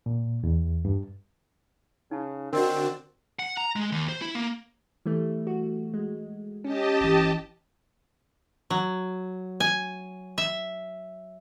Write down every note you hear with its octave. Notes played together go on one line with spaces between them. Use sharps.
A#2
E2
G2
C#3 D#4 A5
D3 C4 D4 F#4 A#4 D#5
F#5
A#5
G#3
D#2
C5
E4
A#3
E3 G3 A3
F#4
G#3
C#4 G4 D#5 A5
G1 E3
F#3
G#5
E5